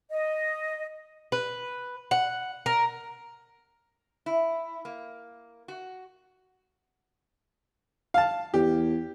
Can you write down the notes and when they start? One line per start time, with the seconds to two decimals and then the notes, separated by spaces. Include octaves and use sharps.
0.11 D#5
1.32 B4
2.11 F#5
2.66 A#4
4.26 E4
4.85 A#3
5.68 F#4
8.14 F5 A5
8.54 E2 G4